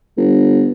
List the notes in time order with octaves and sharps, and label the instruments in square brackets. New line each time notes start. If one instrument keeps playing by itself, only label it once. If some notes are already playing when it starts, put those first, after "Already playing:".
[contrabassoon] G1